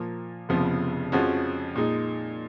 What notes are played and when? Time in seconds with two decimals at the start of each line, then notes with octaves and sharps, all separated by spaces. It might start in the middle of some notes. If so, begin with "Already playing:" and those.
Already playing: A#2 F3 A#3
0.49 F1 F2 C#3 F3 B3
1.12 F2 F3 G#3 C#4 F#4
1.75 A#2 G#3 D#4